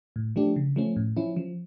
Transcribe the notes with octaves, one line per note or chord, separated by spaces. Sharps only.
A2
F3 A3 D4 G4
C#3
F3 A3 C#4
A2
F3 C#4 E4
F3